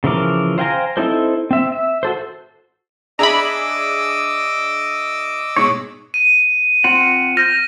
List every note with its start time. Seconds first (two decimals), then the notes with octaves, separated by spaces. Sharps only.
0.04 C#3 E3 F3 A#4 D6
0.58 C5 F5 G5 G#5 A#5
0.97 C4 D#4 E4 A4 C5
1.51 C4 E5
1.72 E5
2.03 F#4 A4 C5
3.19 D4 G#4 D#5 E5 A#5 B5 D6 E6
5.56 G#2 B2 C#5
6.14 D#7
6.84 C4 F4 F#5
7.37 F6 G6 A#6